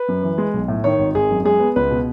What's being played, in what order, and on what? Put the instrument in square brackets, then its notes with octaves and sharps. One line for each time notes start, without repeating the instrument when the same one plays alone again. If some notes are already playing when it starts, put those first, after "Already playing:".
Already playing: [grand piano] B4
F#2
E3
G#3
B1
A2
D#3 C#5
G#1
G#1 G#4
F#2
G#3 G#4
B3
C#2 B4
B2